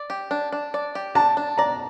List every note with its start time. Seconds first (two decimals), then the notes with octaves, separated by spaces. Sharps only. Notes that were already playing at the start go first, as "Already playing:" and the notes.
Already playing: D5
0.10 G4
0.31 D4
0.52 D4
0.74 D5
0.95 G4
1.15 D4 A5
1.37 D4
1.58 D5 A#5